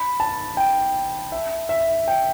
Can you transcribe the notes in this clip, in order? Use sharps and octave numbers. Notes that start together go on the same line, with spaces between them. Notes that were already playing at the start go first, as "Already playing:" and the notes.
Already playing: B5
A5
G5
E5
E5
G5